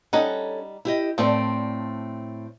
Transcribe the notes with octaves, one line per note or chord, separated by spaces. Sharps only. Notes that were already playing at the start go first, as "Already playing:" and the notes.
G3 C#4 D#4 A4 F#5
E4 G4 D#5
A2 F3 C4 A4 D5